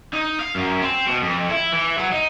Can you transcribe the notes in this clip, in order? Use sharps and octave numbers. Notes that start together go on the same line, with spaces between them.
D#4
F5
F#2
C4
B2
F2
E4
E3
F#3
D#4